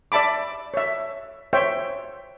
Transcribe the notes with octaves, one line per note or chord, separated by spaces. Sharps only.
D5 E5 A5 B5 D6
C#5 E5
C5 C#5 E5 G5